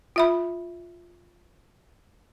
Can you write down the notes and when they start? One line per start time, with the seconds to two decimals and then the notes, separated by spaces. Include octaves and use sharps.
0.16 F4 E5 B5